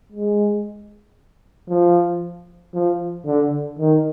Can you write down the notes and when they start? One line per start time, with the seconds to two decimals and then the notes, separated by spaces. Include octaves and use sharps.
0.12 G#3
1.69 F3
2.74 F3
3.26 D3
3.79 D#3